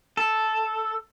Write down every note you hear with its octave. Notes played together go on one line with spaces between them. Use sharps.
A4